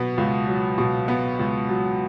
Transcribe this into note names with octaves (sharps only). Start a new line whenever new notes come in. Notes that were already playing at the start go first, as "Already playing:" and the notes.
Already playing: B2 F#3 B3
C#2
F#3
B2
B3
C#2
F#3